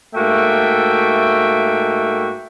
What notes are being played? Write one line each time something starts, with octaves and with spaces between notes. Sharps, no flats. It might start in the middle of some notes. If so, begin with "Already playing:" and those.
G#2 A3 A#3 F#4 E5 G5